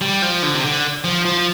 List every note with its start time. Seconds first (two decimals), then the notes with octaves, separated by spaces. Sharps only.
0.01 G3
0.22 F3
0.42 D3
0.54 C3
0.64 D3
1.04 F3
1.25 F3